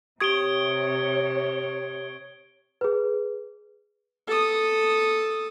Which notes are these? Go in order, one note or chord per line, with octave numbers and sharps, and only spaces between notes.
C3 G4 C#5 C#6 D#6 G#6 D7 G7
G#4 B4
A4 D#6